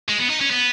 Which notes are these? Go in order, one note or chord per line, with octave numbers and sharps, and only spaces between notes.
G#3
B3
D#4
C#4
B3